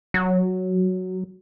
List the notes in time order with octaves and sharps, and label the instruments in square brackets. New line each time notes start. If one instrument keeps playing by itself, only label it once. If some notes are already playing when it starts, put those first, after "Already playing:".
[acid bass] F#3